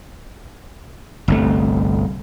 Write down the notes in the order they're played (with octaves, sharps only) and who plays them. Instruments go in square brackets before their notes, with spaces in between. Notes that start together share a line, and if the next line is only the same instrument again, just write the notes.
[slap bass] G1 C2 A3